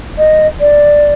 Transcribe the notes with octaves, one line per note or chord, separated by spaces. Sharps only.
D#5
D5